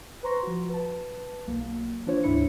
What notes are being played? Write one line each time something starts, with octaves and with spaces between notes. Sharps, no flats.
B4 C5 A#5 C6 C#6 A#6
F3 F#4
B4 A5
B1 F#3 A#3
E3 D4 F4 C5 C#5
D2 G#2 D4 E4 C#7